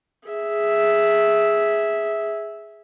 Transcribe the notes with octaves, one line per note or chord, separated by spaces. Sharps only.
G#4 E5